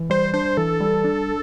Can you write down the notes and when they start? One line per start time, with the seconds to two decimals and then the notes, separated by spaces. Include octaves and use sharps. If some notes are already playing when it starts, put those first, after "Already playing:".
Already playing: E3
0.10 G3 C5
0.34 D4 C5
0.57 E3 A4
0.80 G3
1.04 D4